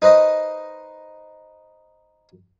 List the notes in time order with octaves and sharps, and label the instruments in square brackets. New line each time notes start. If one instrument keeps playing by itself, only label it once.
[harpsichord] D#4 B4 C5 D#5